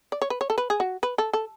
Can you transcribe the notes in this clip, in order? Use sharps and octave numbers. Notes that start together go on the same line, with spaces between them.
D5
C#5
B4
C#5
A4
B4
G#4
F#4
B4
A4
A4